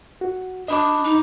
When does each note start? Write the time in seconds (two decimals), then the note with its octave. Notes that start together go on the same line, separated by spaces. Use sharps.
0.21 F#4
0.68 D4 D#5 B5 D6
1.04 D#4